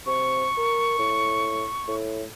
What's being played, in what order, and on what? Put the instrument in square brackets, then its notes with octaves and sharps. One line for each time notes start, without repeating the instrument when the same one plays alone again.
[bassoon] C3 [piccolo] C#6
[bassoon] A#4
A2
A2